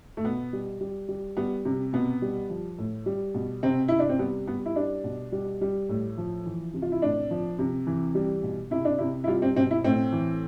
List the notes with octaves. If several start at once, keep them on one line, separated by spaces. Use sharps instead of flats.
A3
B2 B3
G3
G3
G3
G3 B3
C3
B2 B3
G3
F3
A2
G3
B2
C3 C4
C3 E4
D4
C4
G3 B3
G3 B3
E4
G3 D4
B2
G3
G3
A2
F3
E3
C3
F4
E4
A2 D4
F3
C3
E3
G3
B2
C3 E4
D4
C3 E4
E4
G3 F4
C4
B2 C4
E4
A2 C4
E3